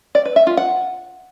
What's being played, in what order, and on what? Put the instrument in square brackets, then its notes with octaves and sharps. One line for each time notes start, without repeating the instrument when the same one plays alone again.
[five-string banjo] D5
B4
E5
F4
F#5